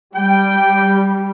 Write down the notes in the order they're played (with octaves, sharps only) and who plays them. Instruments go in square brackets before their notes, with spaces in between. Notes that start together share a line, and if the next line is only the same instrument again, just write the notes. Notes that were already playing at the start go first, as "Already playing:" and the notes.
[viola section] G3 [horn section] G5